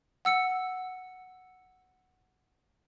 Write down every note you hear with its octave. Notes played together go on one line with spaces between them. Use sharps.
F#5 E6 C#7